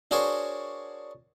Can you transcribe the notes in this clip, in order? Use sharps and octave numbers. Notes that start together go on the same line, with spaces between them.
D4 F#4 G#4 A#4 C5 C#5